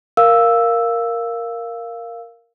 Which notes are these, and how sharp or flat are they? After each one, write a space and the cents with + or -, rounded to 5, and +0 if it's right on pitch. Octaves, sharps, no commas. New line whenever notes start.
A#4 +0 F5 -10 E6 +0